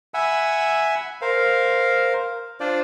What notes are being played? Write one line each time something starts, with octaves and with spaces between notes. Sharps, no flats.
E5 F#5 G#5 B5 E6
A#4 C5 F5
D4 F4 C5 D5